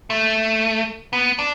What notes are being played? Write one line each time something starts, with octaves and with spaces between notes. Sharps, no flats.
A3
B3
D4